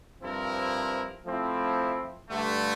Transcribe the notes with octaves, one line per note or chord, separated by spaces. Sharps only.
G2 F3 C4 E4 A#4
F3 A3 C4 E4
G2 D3 A3